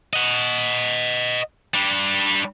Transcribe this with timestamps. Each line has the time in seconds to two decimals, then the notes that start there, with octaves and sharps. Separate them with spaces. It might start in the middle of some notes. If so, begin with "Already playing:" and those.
0.13 D#5 F#5
1.74 G3 D4